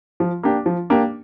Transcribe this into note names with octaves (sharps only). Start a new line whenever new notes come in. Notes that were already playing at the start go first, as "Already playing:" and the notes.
F3
A#3 D4 G4
F3
A#3 D4 G4